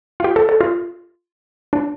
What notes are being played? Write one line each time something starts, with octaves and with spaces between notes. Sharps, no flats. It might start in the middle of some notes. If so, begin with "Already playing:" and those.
F4
G4
A4
A4
F4
D4